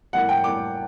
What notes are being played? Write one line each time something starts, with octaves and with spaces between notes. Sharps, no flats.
A2 G3 A#3 F#5
G5
A2 G3 A#3 D6